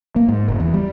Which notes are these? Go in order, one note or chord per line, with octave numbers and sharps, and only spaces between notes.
A#3
G#2
F#1
E2
G3